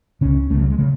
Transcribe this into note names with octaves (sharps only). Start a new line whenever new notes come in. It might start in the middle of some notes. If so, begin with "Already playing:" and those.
C#2 C#3 C#4
C#2 C#3 A3
F#3
G#3
C#3 A3